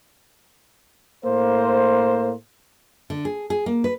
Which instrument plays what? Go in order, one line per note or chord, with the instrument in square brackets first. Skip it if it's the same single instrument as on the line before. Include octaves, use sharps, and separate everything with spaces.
[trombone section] A2 A#3 C5
[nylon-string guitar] D3
G#4
G#4
A#3
B4